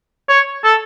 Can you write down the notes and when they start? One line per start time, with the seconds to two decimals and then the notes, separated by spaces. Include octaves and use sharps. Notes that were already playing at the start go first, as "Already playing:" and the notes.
0.29 C#5
0.64 A4